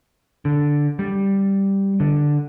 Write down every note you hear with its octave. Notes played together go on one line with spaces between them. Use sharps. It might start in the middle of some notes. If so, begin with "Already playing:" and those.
D3
G3
D3